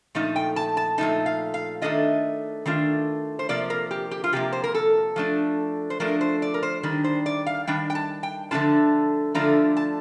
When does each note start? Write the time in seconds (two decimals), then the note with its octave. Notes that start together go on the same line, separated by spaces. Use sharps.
0.15 A#2 F3 A3 D#4
0.36 G5
0.56 A5
0.77 A5
0.98 A#2 F3 A3 D#4 A5
1.26 F5
1.54 F5
1.82 D#3 A3 D4 F4 D#5
2.66 D#3 A3 D4 F4
3.39 C5
3.49 C3 F3 A#3 D5
3.70 A#4
3.91 G4
4.11 G4
4.24 F4
4.33 C3 F3 A#3 G4
4.53 C5
4.64 A#4
4.74 A4
5.16 F3 A3 D4
5.90 C5
6.00 F3 A3 D4 A#4
6.21 C5
6.42 D5
6.54 A#4
6.63 C5
6.83 D#3 G3 D4
7.04 C5
7.26 D5
7.46 F5
7.67 D#3 G3 D4 G5
7.90 G5
7.95 A5
8.23 G5
8.51 D3 F3 A3 D4 F4 A5
9.35 D3 F3 A3 D4 F4 A#5
9.77 A5